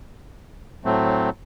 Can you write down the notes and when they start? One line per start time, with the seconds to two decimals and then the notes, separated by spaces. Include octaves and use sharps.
0.85 A2 F#3 A3 C4